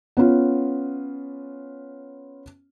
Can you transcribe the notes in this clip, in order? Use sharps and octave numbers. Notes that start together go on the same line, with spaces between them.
B3 C#4 F4